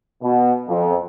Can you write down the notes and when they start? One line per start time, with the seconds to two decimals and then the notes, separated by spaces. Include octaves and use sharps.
0.23 B2
0.68 F2